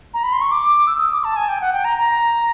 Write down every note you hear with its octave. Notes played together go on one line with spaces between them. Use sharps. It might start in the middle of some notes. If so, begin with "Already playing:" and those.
A#5
B5
C6
C#6
D6
E6
D#6
D6
A5
G#5
G5
F#5
G5
A#5
A#5